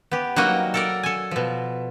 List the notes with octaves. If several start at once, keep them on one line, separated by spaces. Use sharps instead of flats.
B3 G4
F#3 G3 A#3 D#4 F#4 D#5
A4 A#4 D5
A4 G#5
B2 F3